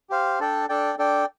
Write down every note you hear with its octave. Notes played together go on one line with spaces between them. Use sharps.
G4 C5 F5
D4 A4 D5 G5
D4 A4 D5 G5
D4 A4 D5 G5